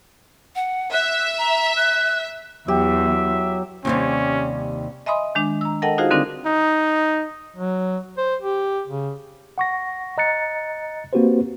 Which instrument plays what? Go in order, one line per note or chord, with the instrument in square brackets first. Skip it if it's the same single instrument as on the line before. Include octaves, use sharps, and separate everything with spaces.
[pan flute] F#5
[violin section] E5 [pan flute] F#6
[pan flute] A#5
F#6
[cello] E2 [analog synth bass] F#3 [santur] G4 [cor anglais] E5
[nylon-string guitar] D#2 C3 G3 [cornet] C#4
[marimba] D#5 E5 G#5 B5 C6 D#6
D#3 G#3 D4
A#5 E6
A4 A#4 D#5 F#5 G5 A5
D#4 F4 F#4 G#4 C5 F5
D3 G3 C4 D4 D#4 A#4
[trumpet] D#4
[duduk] F#3
C5
G4
C#3
[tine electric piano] F#5 C#6 A#6
D#5 A#5 F#6 A6 C#7
A#3 C4 F#4 G4 B4 C5